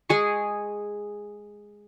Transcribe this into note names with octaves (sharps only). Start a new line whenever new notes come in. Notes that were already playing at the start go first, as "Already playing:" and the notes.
G#3 G#4 C#6